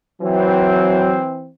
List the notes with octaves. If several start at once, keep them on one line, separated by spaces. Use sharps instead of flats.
E3 F#3 C4